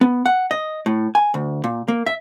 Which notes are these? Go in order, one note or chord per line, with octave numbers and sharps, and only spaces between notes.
B3
F#5
D#5
A2
G#5
D2
A#2
A#3
E5